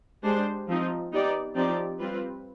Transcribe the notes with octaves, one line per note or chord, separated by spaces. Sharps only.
G#3 D4 G4 C5
F3 C4 D#4
B3 D#4 G4 D5
F3 C4 D#4 G4 D5
G3 C4 F4 B4